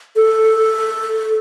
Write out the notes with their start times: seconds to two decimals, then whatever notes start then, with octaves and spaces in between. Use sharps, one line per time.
0.16 A4